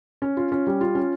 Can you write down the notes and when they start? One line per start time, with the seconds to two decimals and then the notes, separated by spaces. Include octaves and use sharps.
0.22 C#4
0.37 F4
0.52 C#4
0.67 G3
0.81 F4
0.95 C#4